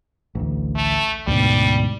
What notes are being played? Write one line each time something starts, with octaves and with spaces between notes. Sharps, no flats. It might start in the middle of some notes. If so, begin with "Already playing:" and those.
A1 D2
A3
D2 G#2 B2 G3